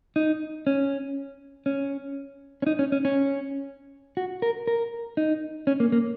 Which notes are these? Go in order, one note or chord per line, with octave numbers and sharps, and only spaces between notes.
D#4
C#4
C#4
C#4
D#4
C#4
C#4
C#4
F#4
A#4
A#4
D#4
C#4
A#3
A#3